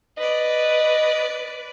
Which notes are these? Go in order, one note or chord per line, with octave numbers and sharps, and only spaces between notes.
B4 D5 D#5